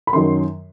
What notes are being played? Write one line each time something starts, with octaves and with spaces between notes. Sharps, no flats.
B5
F#2 D#3 F#3 C6